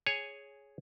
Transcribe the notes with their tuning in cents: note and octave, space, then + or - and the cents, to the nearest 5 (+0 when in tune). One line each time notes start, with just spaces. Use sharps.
G#4 +0 C#5 +0 G#5 -5